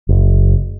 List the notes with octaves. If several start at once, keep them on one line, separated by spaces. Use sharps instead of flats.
F#1